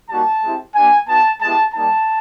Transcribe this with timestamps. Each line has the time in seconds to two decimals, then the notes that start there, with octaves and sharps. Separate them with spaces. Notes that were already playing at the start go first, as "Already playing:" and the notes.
0.10 G3 A#3 D#4 F#4 A5
0.43 G#3 C4 E4 G4
0.75 A#3 D4 G4 G#5
1.08 B3 D#4 F#4 A5
1.41 G#3 B3 E4 G4 A5
1.74 G3 A#3 D#4 A5